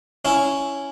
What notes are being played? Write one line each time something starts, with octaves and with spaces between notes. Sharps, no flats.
C#4 E4